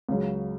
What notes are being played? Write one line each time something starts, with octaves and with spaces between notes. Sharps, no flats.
C#2 C#3 F#3